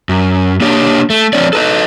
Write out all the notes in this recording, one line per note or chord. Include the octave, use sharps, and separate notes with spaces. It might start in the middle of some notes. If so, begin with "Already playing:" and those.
F#2
A#3 D4 G4 C#5
A3
F3 C4 C#5 D5
A4 B4 D#5